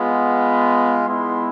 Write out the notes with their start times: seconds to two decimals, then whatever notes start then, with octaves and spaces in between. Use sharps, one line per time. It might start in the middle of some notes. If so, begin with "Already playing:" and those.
Already playing: G#3 B3 F4
1.07 G#3 B3 E4 C6